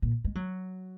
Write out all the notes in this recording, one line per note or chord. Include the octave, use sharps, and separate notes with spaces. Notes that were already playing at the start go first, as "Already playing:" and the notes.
A#2
G#3
F#3